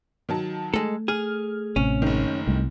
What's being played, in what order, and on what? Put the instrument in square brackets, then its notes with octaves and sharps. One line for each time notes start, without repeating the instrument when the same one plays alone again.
[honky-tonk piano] D#3 F#3 A5
[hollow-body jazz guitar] G#3 A4 [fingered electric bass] A3
[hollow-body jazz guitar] G#4 [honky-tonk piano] F6
[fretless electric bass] A1 C3 [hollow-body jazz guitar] C#4
[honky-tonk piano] F#1 D#3
[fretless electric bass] C2 [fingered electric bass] G3 A3 C#4